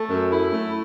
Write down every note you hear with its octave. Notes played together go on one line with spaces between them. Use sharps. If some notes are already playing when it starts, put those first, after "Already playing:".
Already playing: A3
F#2
E4
A3